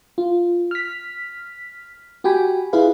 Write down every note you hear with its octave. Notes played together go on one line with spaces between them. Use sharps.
F4
F6 B6
F#4 G4 G5 G#5 B5
E4 F4 G#4 B4 F5